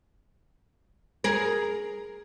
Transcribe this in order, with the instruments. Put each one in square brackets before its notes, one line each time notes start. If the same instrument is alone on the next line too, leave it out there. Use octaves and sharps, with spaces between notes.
[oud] G#4 A#4